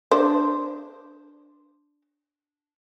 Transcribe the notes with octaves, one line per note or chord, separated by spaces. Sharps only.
D4 C5